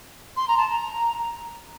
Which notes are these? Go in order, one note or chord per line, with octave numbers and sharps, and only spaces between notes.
C6
A#5
A5
A#5